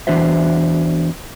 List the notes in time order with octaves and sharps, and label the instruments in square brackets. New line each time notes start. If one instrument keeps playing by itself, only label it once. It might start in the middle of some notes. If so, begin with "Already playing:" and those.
[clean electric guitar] E2 E3 D4 F#4 C5 E5